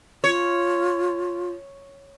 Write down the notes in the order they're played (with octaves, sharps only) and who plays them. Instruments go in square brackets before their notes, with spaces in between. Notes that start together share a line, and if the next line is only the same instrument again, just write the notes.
[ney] F4 [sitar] C#5